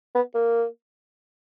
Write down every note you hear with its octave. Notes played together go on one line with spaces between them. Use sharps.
B3
A#3